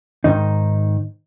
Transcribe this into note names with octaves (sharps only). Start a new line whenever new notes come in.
G#2 D#3 D#4